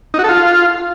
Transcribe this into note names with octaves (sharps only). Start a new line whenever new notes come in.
D#4
F#4
A4
F4